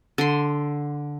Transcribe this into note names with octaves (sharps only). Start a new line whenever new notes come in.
D3 C6